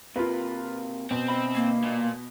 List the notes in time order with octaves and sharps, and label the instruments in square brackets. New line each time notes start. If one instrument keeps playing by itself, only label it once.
[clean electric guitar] C3 A#3 [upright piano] F4 B4
[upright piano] B2 [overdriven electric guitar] C4
[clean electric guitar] D2 D#5 B5
[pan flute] A#3
[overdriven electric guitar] A#2